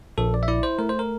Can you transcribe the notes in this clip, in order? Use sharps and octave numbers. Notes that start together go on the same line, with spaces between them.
A#1 A4
D5
E5
E4 D5
C5
A3 A#4
C5
A#4